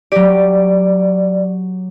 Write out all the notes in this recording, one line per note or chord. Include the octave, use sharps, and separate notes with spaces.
F#3 G4 D5